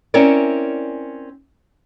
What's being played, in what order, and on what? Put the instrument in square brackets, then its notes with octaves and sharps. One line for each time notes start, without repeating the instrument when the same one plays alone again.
[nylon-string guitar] C4 C#4 E4 A#4 C#5 D5